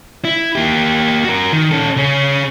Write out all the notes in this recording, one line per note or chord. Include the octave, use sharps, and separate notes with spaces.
E4
A#3 G4
F#4 A#4
D#3
C#4 A4
C#3 C#4